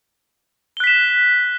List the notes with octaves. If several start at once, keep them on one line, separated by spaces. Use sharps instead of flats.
F#6 B6 E7 G7